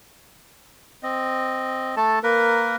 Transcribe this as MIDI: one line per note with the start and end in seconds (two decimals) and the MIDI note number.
1.03 1.95 60
1.03 1.95 75
1.97 2.19 57
1.97 2.19 69
1.97 2.19 81
2.23 2.76 58
2.23 2.76 70
2.23 2.76 71